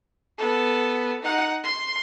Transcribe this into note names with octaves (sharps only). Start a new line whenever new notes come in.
B3 A4
D#4 F#5
C6